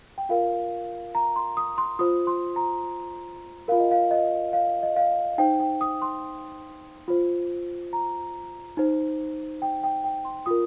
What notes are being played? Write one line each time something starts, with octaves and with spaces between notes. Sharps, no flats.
G5
F4 A#4 F5
A#5
C6
D#6
C6
F4 C5 D#6
C6
A#5
F4 A#4 F5
D#5
F5
D#5
F5
D#5
F5
D#4 C5 G5
G5
D#6
C6
F4 C5
A#5
D#4 C5
G5
G5
G5
C6
F4 A#4 D#6